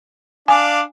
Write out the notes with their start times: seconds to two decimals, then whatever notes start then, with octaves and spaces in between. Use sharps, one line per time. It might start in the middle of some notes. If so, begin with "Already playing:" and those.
0.48 D4 D5 F5 G#5